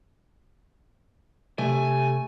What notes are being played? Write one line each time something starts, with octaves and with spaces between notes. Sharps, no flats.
C3 A3 G#5